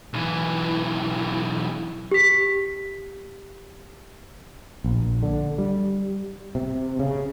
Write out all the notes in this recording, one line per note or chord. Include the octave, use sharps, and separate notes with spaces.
B1 E3
G4 B6
A#1
D3
G3
C3
C#3